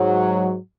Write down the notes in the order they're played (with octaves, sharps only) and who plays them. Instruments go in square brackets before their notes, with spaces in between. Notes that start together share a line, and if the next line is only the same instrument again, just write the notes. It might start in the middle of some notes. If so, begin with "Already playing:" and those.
Already playing: [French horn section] G#2 F#3